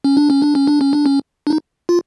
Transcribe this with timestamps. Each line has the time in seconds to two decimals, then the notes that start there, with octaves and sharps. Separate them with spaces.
0.04 C#4
0.17 D4
0.30 C#4
0.42 D4
0.55 C#4
0.67 D4
0.81 C#4
0.93 D4
1.06 C#4
1.47 D4
1.50 D#4
1.89 F4